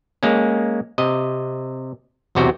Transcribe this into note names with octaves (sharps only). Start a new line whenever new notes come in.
G#3 A#3 C#4
C3 D#5
B1 E2 C3 F#4 G5